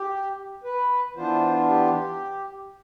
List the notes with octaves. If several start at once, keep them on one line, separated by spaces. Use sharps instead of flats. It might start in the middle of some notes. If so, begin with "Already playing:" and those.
Already playing: G4
B4
E3 B3 D4 F4 C5
G4